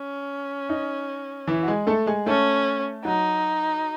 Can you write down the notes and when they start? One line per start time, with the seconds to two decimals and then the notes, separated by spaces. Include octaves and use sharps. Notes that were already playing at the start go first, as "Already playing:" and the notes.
Already playing: C#4
0.69 D#4
1.47 E3 E4
1.63 F#4
1.68 G#3 G#4
1.87 A3 A4
2.07 G#3 G#4
2.26 A3 C#4 A4
3.04 F#3 D#4 F#4